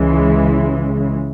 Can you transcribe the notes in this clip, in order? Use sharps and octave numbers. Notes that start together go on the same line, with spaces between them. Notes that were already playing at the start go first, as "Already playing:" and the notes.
Already playing: C#2 C#3 E3 G#3